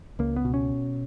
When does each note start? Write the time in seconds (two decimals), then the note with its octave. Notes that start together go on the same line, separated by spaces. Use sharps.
0.19 C#2 A#3
0.36 B3
0.45 B2
0.54 C#4